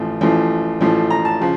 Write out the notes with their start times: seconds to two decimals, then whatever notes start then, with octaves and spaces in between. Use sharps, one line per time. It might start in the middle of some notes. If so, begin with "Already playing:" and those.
Already playing: A1 A2 F3
0.21 A1 A2 F3
0.81 A1 A2 F3
1.10 A#5
1.25 A5
1.41 C#3 F3